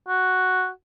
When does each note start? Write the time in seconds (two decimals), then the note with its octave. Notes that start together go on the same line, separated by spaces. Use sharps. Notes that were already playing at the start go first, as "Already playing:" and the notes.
0.08 F#4